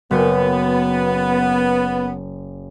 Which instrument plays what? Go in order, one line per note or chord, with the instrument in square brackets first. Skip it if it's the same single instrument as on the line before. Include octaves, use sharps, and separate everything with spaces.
[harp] F#1 [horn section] B3